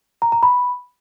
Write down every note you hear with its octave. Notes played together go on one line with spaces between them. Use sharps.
A#5
A#5
B5